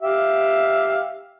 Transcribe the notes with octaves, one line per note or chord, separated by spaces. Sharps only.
G4 E5 F5